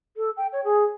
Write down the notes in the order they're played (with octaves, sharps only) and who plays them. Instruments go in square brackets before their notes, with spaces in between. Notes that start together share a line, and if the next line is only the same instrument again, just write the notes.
[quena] A4
G5
C#5
G#4